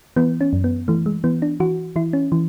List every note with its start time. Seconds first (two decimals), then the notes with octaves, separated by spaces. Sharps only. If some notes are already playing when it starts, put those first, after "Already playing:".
0.16 E3 B3
0.41 C#4
0.53 F#2
0.64 B3
0.88 E3 A3
1.06 G#3
1.24 E3 B3
1.42 D4
1.60 E3 F#4
1.96 E3 E4
2.13 C#4
2.32 E3